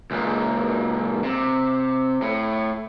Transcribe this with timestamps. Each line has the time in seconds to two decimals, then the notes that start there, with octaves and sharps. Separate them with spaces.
0.11 C#2 A#2
1.24 C3
2.22 A2